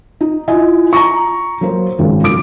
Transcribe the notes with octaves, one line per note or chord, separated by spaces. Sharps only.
D#4
E4 F4 D#5 G#5
A#5 C#6
F#3 A#3 C5
G#1 C#3
B1 D6 D7